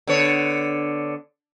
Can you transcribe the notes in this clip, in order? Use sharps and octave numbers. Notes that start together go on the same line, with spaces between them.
D3 B3 C#5